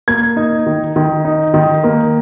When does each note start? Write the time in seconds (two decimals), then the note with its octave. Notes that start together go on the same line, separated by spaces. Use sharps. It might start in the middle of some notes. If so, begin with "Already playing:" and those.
0.08 A#3 G#6
0.36 D#4
0.66 D#3
0.96 D#3
1.25 D#4
1.54 D#3
1.84 A#3